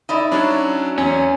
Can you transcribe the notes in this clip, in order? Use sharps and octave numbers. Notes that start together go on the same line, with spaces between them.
D#4 E4 D5
F#3 C#4 D4
E2 C#4